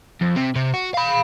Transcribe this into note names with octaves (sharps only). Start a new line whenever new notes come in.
F2
C3
C3
F#4
F5 B5